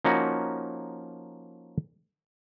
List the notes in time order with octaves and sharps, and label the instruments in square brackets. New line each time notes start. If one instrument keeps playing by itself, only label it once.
[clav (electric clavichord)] F3 A#3 C#4 D#4 F#4